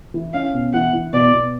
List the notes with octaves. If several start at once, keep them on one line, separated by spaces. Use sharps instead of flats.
E3
C#4 F5
B2
E3 F#5
E3
B2 D5
B2